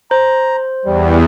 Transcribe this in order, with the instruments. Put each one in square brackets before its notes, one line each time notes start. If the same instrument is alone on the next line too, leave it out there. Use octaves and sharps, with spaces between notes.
[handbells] C5 [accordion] A#5
[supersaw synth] E2 [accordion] G3